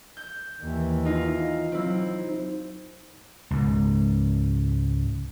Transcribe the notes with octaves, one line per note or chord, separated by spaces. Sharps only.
G6
D#2 E3
D#4 F4
F#3 C4 E4
C#2 G#2